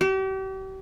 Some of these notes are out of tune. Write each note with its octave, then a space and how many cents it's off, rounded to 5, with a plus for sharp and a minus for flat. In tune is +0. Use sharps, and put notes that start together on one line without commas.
G4 -40